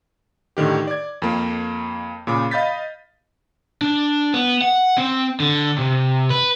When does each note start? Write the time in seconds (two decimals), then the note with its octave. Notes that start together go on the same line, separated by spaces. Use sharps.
0.57 A2 D3 D#3 G4
0.87 D5 D6 G#6
1.22 F2 A#3
2.27 A#2 C#3 B5 D6
2.51 D#5 F5 B5 G6 A6 B6
3.81 D4
4.34 B3
4.61 F#5
4.98 C4
5.40 D3
5.78 C3
6.30 B4